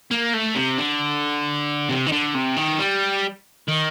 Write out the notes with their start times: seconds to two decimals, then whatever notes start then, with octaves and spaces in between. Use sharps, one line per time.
0.11 A#3
0.34 A3
0.55 C3
0.78 D3
1.89 C3
2.06 D#3
2.12 D3
2.34 C3
2.56 D#3
2.79 G3
3.68 D#3